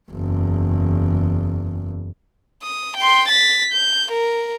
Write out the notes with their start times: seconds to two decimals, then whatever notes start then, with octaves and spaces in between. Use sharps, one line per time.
0.11 F#1 E2
2.62 D#6
2.97 G5 C6
3.29 A6 B6
3.73 G6
4.12 A#4